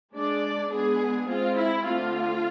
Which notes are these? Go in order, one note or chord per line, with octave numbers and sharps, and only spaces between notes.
G#3 D4 D5
G#3 B3 D4 G#4
G#3 C4 F4
E4
D3 A3 C4 F4